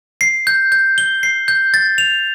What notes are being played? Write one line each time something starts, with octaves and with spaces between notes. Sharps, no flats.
C7
G6
G6
G7
C7
G6
A6
F7